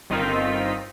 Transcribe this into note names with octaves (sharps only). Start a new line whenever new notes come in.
G1 D#3 C4 D#4 F4 B6